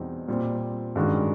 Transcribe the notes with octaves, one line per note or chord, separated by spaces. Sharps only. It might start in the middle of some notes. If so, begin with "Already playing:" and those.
Already playing: E2 B2 G3 C4 D#4
A#2 G3 C4
G2 D#3 G#3 C#4 F#4